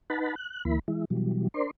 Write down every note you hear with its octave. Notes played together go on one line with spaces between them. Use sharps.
D#4 B4 F#5 A5 B5
F#6
D2 E3 A#3 E4 B5
E3 G#3 E4
B2 E3 F#3 G3
D4 A#4 C5 D5 C6